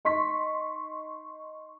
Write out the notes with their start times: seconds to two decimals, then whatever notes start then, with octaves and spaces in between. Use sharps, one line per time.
0.05 D#4 C6 C#6 B6